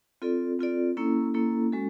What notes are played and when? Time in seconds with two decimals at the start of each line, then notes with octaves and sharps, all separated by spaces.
0.22 C4 F4 A4 D5
0.59 C4 F4 A4 D5
0.97 A#3 C#4 E4 A4
1.34 A#3 C#4 E4 A4
1.72 G#3 C#4 F#4 A4